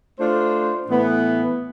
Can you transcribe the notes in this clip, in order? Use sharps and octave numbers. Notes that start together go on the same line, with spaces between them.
A3 D4 F4 C5
A2 E3 B3